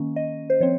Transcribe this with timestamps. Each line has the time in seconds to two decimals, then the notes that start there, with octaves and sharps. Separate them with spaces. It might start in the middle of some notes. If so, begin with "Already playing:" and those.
Already playing: D#3 A#3 C#4
0.16 D#5
0.50 C5
0.61 F3 C4 C#5